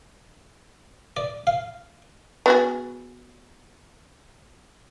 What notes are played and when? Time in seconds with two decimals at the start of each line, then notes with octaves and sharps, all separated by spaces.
1.17 D5
1.47 F5
2.46 B3 F#4 G#4